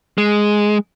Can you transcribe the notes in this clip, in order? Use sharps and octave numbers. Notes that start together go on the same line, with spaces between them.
G#3